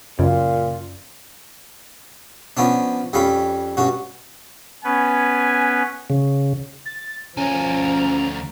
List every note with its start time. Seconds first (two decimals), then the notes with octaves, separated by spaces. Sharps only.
0.19 F#2 A#2 C#3 F4
2.57 F3 B3 C#4 D4
3.13 F2 G3 C#4 F5 B5
3.77 G2 C#4 F#4
4.84 B3 C#4 B4 G#5
6.10 C#3
6.85 A6
7.37 D2 F3 C#4 G#5 A#5